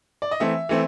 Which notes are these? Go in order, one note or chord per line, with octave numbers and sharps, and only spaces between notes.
D5
D#5
E3 A3 C4 E5
E3 A3 C4